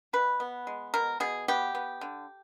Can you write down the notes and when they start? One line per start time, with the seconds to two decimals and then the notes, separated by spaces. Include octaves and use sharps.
0.13 B2 B4
0.40 B3
0.67 G#3
0.94 B2 A#4
1.20 B2 G#4
1.48 B3 G4
1.75 B3
2.01 D3